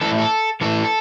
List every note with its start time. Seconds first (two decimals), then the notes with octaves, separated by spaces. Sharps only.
0.01 A2 E3 A4
0.18 A4
0.61 A2 E3 A4